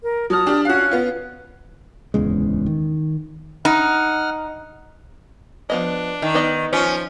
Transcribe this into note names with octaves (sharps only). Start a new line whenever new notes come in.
A#4
F#3 A5 D#6 F6
D4 G4
C#4 F#4 F5 F#6
B3 F4
D1 E2 C#3 G#3
D#3
D#4 F#5 F6
F3 B3 D4 D#5
D#3
B3 D5 D#5
F3 C#4